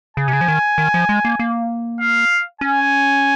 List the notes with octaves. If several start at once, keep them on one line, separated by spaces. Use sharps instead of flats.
C#3 G#5
C3
C#3
F3
D#3
D#3
F3
G#3
A#3
A#3
F5
C#4 G#5